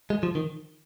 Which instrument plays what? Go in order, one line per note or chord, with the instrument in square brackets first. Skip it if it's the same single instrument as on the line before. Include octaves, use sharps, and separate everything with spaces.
[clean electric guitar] G#3
F3
D#3